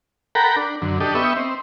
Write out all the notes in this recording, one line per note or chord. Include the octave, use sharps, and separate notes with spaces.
A4 A#4 F#5 G5 A#5 B5
D4
F#2 D3
D4 G4 A4 D#5
B3 D#5 E5 G5 C#6
C4